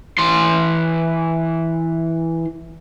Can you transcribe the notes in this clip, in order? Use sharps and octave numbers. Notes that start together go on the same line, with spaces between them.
E3 C6